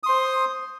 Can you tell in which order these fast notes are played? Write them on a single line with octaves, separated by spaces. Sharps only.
D#6 C6 C5